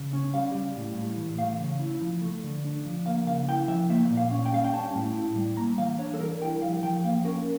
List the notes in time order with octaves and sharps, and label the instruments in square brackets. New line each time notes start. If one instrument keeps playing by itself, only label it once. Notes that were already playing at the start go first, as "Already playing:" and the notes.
Already playing: [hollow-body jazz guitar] C#3
C#4
G3 F5
G3
A2
A2
E3
A3 F5
C#3
E4
F3
A3
D3
D4
F3
A#3 F5
C#3 F5
E4 G5
F3 E5
A#3 E5
A#2
F5
C#4
G5
G3 F5
G5
C#4 A5
A2
E4
G3
A#3 A#5
E3 F5
D4 C#5
A4
G3 A#4
E4 G5
F3 F5
F3 G5
A#3 F5
C#4 A#4